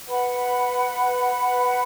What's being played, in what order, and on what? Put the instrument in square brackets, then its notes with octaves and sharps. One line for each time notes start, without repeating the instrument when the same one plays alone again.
[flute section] B4 F#5 B5